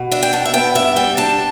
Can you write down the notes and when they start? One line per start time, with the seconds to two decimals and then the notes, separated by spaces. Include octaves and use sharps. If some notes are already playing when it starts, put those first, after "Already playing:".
Already playing: B2
0.11 D4 E5
0.23 G5
0.33 B2 A5
0.45 E5
0.54 B3 G5
0.75 G2 E5
0.96 G3 G5
1.17 D4 A5